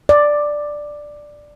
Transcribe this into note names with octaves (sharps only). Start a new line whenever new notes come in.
D5